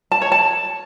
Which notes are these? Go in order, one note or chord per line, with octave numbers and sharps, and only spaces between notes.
A5
C#5
A5